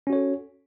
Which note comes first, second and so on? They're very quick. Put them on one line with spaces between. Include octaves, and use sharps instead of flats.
C#4 F#4 C#5 A4